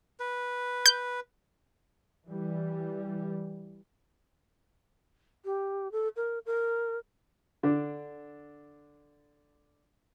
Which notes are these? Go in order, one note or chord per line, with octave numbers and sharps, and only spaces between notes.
B4
G6
E3 G3
G4
A4
A#4
A#4
D3 D4